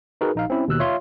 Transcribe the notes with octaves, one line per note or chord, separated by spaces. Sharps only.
D#4 F#4 G#4 A#4 B4
A#1 D#4 F5
C4 C#4 E4
D#2 B2 E6 F#6
F4 C#5 E5 F5 C6